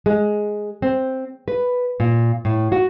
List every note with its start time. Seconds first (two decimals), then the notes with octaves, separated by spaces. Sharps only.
0.06 G#3
0.82 C4
1.48 B4
2.00 A#2
2.45 A2
2.72 F#4